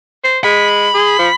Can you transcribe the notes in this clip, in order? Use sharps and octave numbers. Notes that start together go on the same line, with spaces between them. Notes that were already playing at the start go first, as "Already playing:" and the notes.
C5
G#3 B5
G#4
F3